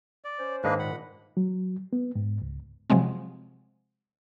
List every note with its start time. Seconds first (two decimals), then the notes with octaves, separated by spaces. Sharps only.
0.24 D5
0.39 C#4 C5
0.64 G#2 D#3 A#3 D4 B4 D#5
0.79 A#2 F#5 B5
1.37 F#3
1.93 B3
2.15 G#2
2.42 C#2
2.90 C3 F3 F#3 G#3 C4